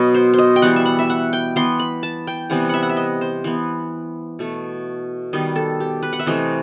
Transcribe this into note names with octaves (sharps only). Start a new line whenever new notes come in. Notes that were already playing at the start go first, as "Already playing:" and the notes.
Already playing: B2 F#3 B3 D#5
C5
C5
D#5
G5
E3 G3 B3 F#5
E5
F#5
E5
F#5
G5
E3 B3 C6
B5
A5
G5
C3 E3 G3 B3 F#5
E5 F#5
F#5
E5
D#5
C5
E3 B3
B2 A3
D#3 G3 B3 D#5
A4
G4
B4
F#5
E5
C3 E3 A3 D#5